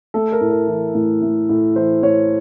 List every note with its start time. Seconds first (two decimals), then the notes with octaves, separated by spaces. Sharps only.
0.14 A3 A4
0.32 A#4
0.41 A2
0.50 A#4
0.67 E3
0.94 A2
1.22 A3
1.49 A2
1.76 E3 C5
2.03 A2 C#5